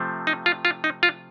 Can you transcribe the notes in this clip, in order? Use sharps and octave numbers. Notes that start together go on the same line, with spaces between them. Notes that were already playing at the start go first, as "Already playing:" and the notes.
Already playing: C3 F3 A3 C4
D#4
F4
F4
D#4
F4